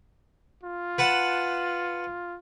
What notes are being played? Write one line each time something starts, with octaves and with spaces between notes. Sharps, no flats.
F4
B4 F#5 A5